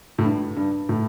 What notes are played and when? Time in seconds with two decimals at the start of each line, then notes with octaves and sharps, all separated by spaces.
0.18 A2
0.24 G2
0.57 G2
0.89 A2